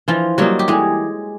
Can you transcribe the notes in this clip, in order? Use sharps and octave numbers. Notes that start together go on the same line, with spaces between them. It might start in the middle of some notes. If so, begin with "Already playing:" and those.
E3 F3 F4
F#3 G3 A#3 D#4 F#4
G4
E3 G#3 G#4